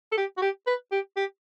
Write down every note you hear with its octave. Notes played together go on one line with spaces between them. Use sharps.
A4
G4
F#4
G4
B4
G4
G4